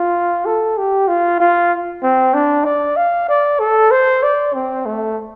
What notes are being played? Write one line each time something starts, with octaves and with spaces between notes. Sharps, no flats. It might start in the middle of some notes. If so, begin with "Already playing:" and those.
Already playing: F4
A4
G4
F4
F4
C4
D4
D5
F5
D5
A4
C5
D5
C4
A3